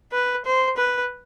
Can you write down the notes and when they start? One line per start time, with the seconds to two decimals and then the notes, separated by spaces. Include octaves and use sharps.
0.12 B4
0.45 C5
0.77 B4